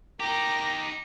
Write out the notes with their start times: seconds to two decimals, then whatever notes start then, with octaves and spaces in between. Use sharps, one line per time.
0.20 D#4 G4 A#4 G5 D6 A#6